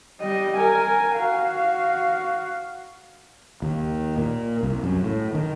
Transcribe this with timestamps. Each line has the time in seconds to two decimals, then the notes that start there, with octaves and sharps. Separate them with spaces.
0.21 G3 D#5
0.56 A#4 G#5
1.16 F#4 F5
3.62 D#2
4.18 A#2
4.63 C2
4.84 F#2
5.04 A2
5.35 D#3